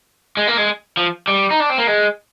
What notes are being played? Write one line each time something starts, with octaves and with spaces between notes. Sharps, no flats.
G#3
A#3
G#3
F3
G3
D#4
D4
C4
A#3
G#3